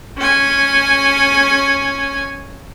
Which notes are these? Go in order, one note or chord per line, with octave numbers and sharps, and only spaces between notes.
C#4 G#5